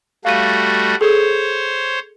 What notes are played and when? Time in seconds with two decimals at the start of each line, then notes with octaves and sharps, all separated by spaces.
0.25 G3 A3 F#4 F5 A6 D#7
1.01 G#4 A4 C5 C#5